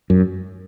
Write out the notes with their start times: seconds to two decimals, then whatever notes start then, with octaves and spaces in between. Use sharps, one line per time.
0.10 F#2